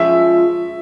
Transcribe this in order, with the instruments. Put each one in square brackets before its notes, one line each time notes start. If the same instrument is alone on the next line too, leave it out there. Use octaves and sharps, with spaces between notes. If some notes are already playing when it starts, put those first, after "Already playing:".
Already playing: [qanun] F3 G#3 C#4 F4 [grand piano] E5